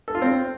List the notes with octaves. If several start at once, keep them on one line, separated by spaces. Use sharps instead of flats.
A4
F4
C4